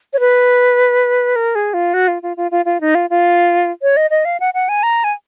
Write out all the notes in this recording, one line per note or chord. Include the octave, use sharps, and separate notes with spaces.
C#5
B4
A#4
G#4
F4
F#4
F4
F4
F4
F4
F4
D#4
F4
F4
C#5
D#5
D#5
F5
F#5
F#5
G#5
A#5
G#5